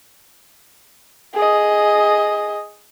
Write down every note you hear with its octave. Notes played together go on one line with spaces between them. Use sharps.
G#4 D#5